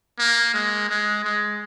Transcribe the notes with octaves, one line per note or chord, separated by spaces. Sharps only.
A#3
G#3
G#3
G#3